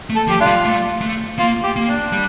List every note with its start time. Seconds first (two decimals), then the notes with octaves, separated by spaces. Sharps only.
0.10 A3
0.16 A4
0.28 F3 G4
0.41 D4 F4
0.46 G3
0.65 A3
1.02 A3
1.39 A#3 F4
1.64 G4
1.76 A#3
1.89 D4
2.12 G3